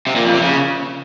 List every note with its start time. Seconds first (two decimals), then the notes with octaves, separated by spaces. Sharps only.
0.07 C3
0.16 A#2
0.25 F2
0.33 C3
0.42 C#3